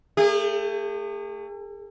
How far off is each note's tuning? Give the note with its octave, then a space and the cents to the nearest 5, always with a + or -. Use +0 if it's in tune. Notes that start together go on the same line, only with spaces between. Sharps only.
A3 +35 G#4 -40